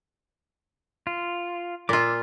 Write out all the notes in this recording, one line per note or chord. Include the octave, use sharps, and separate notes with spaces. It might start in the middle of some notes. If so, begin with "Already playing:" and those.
F4
A#2 F4 D6 E6